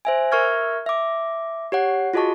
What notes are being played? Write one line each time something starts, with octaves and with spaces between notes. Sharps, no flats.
C5 E5 G#5
A#4 E5 C#6 F6 G#6
E5 D6
G4 C#5 F#5
F4 F#4 G#4 D#5 A5 C#6